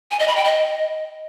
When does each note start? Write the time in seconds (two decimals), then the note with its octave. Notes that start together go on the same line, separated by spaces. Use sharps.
0.11 G#5
0.19 D#5
0.28 B5
0.36 G5
0.45 D#5